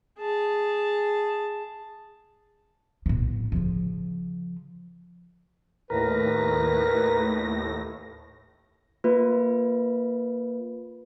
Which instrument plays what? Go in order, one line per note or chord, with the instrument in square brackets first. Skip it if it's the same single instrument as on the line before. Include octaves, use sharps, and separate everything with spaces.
[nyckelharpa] G#4 A5
[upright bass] A2 B3
C#3 F3
[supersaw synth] D#2 A2 A#6 [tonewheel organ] A#4 [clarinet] B4
[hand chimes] A#3 F4 B4